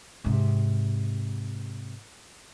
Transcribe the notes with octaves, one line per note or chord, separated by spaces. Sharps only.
G#2 C3